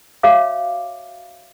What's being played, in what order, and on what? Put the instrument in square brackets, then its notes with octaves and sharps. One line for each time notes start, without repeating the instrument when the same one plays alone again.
[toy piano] F#4 C#5 E5 F5 D6